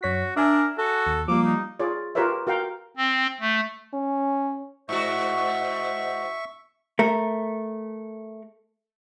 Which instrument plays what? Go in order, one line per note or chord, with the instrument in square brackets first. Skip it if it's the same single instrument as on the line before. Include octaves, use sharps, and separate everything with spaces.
[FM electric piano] F#2 C#5 B6 [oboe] F#4
[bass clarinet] D4 [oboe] A#4 [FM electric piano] E5 G#5 E6
[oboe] F#4 [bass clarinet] A4
[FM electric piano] D#2
[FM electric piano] F3 G3 [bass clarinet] A#3 [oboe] D6
[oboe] D#4
[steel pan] F4 G#4 C#5 D5
F4 G4 A#4 B4 C#5 E5
F#4 A#4 F5 G5
[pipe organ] C4
A3
[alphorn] C#4
[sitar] G#2 F#4 [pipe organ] C5 D#5 [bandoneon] E5 C#6
[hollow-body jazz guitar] A3 A#4